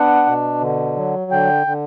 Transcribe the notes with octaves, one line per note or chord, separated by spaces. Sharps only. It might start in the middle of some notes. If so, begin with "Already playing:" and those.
Already playing: B3 D4 F#5
B2
D3
F#3
D3 G5
D3